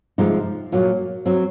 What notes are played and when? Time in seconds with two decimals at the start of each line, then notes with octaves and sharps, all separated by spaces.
0.18 C3 F3 G#3 D#4
0.72 A#2 F#3 A#3
1.26 F#3 C4